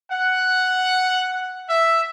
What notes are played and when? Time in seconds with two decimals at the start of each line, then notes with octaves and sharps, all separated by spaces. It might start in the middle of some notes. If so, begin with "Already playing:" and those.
0.12 F#5
1.69 E5